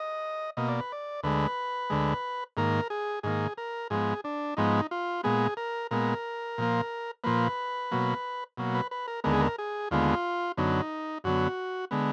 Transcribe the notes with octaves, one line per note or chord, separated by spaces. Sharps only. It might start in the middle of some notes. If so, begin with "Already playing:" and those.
Already playing: D#5
B2 A#3 D#5
D5
B4
D5
D2 D3 G#3 B4
D2 D3 G#3
G#2 D#3 A#3 A#4
G#4
G#2 D#3 A#3 G#4
A#4
G#2 F3 G#3 B3 G#4
D4
G#2 F3 G#3 B3 D#4
F4
A#2 G#3 B3 G#4
A#4
A#2 G#3 B3 A#4
A#2 F3 A#3
A#2 F3 A#3 B4
B2 F#3 A#3
B2 F#3 A#3
B4
B4
A#4
D#2 D3 G#3 B3 A#4
G#4
A#4
G#4
D#2 D3 G#3 B3 F4
F#2 D3 F#3 B3 D#4
F#2 D3 F#3 B3 F#4
D3 G#3 B3